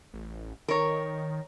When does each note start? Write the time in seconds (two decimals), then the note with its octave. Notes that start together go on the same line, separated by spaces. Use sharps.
0.14 A1
0.68 D#3 A#4 C#5